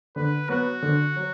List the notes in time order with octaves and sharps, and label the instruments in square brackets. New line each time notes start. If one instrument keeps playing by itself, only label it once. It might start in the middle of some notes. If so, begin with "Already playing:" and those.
[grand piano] D3 [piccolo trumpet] B4
[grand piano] F#3 B3 [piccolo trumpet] F#4
[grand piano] D3
F#3